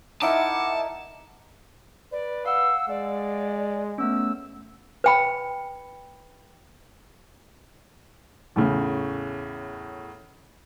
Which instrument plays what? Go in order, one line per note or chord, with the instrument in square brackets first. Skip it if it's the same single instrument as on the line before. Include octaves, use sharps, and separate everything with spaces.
[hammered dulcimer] D#4 E4 A#4 [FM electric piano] E5 D6 [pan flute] F#5 [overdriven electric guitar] A5
[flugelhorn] B4 [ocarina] D5
[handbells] F5 F#5 [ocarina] E6
[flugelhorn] G#3 [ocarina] D5
[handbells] A3 B3 C#4 [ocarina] E6
[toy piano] B4 G5 B5
[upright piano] E2 A2 C#3